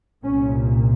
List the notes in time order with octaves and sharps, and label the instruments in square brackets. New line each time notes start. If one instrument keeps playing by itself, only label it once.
[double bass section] C2 A#2 C#4